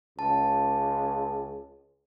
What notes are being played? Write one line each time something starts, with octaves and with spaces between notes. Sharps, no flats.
C#2 A5